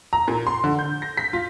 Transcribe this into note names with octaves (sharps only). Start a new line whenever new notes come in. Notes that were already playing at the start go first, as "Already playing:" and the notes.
A#5
A#2
C6
D3
G6
A#6
B6
F4